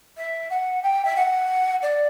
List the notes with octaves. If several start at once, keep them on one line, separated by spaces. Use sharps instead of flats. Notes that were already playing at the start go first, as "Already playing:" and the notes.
E5
F#5
G5
E5
F#5
D5